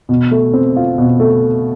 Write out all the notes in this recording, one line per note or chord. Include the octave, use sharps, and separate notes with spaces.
B2
A3
C4
F4
B2
A3